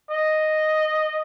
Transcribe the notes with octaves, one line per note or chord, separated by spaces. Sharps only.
D#5